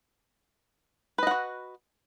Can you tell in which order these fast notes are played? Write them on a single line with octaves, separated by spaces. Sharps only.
B4 D#5 F#5 F#4